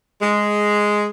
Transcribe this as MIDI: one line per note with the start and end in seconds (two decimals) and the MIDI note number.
0.22 1.08 56